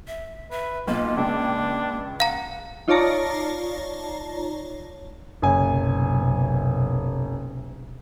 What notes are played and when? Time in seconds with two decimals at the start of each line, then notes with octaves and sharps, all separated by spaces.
0.07 E5
0.51 B4 E5
0.87 B1 A#3 F4
1.17 C#2 D4 G5
2.20 F5 F#5 A#5
2.88 D#4 F4 C#5 D5 A5 A#5
5.42 F#1 B1 C3 G#5